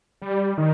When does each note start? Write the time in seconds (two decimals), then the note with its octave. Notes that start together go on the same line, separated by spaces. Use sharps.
0.22 G3
0.58 D#3